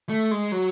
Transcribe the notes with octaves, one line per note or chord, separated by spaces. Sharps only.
A3
G#3
F#3